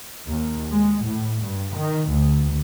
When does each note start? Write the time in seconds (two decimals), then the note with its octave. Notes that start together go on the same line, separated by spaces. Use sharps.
0.27 D#2
0.70 G#3
1.04 A2
1.41 G2
1.77 D#3
2.10 D2